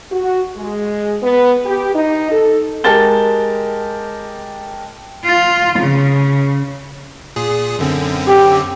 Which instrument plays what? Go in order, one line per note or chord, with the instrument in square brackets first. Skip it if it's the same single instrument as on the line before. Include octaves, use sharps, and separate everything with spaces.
[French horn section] F#4
G#3
B3
G4
D#4
A4
[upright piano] G#3 G4 A#4 A5 A6 G7
[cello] F4
C#3
[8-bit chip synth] A#2 G#4
F#2 D3 C4
[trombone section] G4